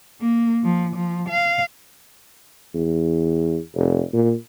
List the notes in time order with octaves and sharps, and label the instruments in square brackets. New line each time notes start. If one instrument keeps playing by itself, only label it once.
[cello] A#3
F3
F3
F5
[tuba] E2
F1
A#2